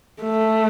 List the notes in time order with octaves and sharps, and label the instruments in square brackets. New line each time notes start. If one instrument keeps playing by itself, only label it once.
[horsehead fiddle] A3